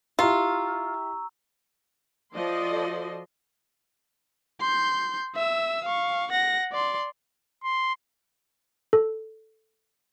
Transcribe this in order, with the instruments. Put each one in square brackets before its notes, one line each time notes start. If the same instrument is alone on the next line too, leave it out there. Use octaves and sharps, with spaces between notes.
[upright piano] E4 G4 [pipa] F4 [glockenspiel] A#5 C#6 E6
[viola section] F3 F#4 A4 D5 D#5 C6
[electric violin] C6 G6
E5 E6
F5 C#6
F#5 A#6
D5 C6
[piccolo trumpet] C6
[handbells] A4